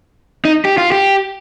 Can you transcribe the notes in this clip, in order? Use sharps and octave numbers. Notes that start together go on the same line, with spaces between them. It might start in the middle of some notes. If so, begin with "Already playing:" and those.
D#4
G4
F4
G4